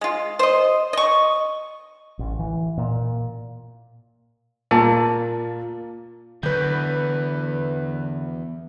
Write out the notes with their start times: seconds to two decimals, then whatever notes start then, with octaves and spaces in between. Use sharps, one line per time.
0.01 G#3 F4
0.39 C5 D#5
0.93 D#5 C#6
2.19 A1
2.39 E3
2.78 A#2
4.71 A#2 A#3 A5
6.43 E2 D3 F#3 B4 G6